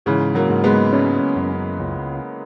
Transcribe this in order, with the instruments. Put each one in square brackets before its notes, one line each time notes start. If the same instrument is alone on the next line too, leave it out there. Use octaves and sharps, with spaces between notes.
[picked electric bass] G#2 [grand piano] C#3 E3
[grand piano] F#3 A#3
[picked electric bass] G#2
[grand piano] G#3 B3
[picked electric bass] C#4
F#2
C#2